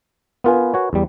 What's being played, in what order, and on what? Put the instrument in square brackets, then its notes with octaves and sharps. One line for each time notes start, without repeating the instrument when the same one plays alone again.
[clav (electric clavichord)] B3 F4 [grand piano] A#4 B4 G#5
[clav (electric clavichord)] F#4 C#5
E2 G3